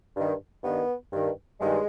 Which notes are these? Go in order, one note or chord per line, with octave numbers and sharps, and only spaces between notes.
G2 D#3
G2 D#3 B3
G2 D#3
G2 D#3 G#3